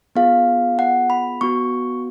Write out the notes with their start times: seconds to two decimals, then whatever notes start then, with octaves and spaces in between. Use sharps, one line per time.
0.16 B3 F4 G#4 F5
0.79 F#5
1.10 B5
1.41 B3 F#4 C#6